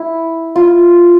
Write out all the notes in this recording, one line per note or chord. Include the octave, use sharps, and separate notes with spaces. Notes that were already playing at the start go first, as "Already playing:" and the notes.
Already playing: E4
F4